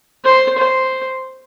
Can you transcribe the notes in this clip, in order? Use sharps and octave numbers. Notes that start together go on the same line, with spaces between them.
C5
C5